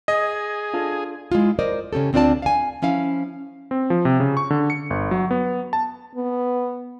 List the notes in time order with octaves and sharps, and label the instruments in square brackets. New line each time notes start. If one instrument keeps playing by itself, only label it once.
[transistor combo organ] G#4 [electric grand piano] D#5
[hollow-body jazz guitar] D4 F4 A4
[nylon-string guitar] G#3 E4 F4
A#4 C5 D5 D#5
C#3 C#4 G4 A4
D2 C4 D4 F4 D5 A5
F5 G#5
F3 C#4 E4 F5
[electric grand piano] C4
F3
C3
C#3
C#6
D3
C#7
G1
F#3
B3
A5
[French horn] B3